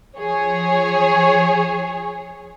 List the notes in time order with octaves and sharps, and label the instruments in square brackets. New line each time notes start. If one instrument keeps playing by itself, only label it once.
[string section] F3 G#4 C#5